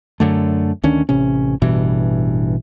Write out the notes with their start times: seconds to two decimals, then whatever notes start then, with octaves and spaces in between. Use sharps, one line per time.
0.20 F#2 D3 A3
0.83 D2 D#3 C#4 D4
1.09 A1 C3 C#4
1.62 A1 G2 B2 E3